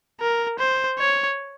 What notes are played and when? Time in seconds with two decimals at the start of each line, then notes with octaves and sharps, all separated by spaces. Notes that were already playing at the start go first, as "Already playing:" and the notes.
0.20 A#4
0.59 C5
0.99 C#5